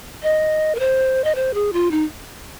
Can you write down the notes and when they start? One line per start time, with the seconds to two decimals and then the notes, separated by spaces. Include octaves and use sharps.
0.23 D#5
0.75 A#4
0.79 C5
1.24 D#5
1.35 C5
1.54 G#4
1.73 F4
1.91 D#4